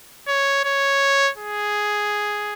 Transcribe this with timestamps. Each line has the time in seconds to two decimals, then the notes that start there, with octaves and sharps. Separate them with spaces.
0.28 C#5
0.65 C#5
1.38 G#4